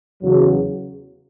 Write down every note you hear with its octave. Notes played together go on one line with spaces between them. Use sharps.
E2 C#3 F#3